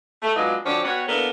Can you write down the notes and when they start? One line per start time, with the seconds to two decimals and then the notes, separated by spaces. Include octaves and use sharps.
0.22 A3
0.35 F#3 G#3 B3 D4 D#4 F4
0.65 D3 F3 C4 C#4 F#4 D5
0.83 G3 B3 F#4 C#5
1.07 A#3 B3 D4 E4 A4 A#4